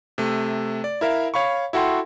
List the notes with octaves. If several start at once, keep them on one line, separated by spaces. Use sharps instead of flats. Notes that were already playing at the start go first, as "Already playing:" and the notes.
C3 A3
D5
E4 A#4 E5 F5
C#5 F5 B5 C#6
E4 F#4 A4 F#5 G5 C6